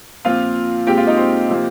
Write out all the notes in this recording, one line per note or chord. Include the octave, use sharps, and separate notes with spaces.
A#2 F3 C4 F4 F5
A#2 G#3 C4 G4 G5
F4 F5
D#4 D#5
C4 C5
C3 F3 A#3